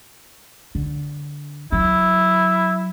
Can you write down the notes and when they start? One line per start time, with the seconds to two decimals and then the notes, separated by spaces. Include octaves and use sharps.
0.75 D3
1.72 F#3 E4